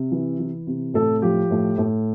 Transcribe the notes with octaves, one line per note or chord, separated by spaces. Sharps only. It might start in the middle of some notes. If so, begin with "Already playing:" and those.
Already playing: C3
E3
E3
C3
A2 A4
F3 G4
A2
A2